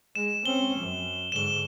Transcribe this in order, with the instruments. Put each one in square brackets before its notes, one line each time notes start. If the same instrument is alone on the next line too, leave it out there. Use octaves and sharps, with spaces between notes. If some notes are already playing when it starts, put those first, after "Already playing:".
[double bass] G#3 [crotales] E7
[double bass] C4 C#4 [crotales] G7
[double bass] F#2
[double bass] G#2 D3 [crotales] E7 G7